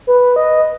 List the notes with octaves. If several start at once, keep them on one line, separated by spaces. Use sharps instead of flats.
B4
D#5